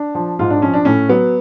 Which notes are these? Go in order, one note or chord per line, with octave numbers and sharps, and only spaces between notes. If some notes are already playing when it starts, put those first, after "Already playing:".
Already playing: D4
F3
G#2 F4
D4
F3 C#4
D4
A2 C#4
F#3 B3